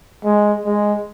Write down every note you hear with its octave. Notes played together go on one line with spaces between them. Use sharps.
G#3
G#3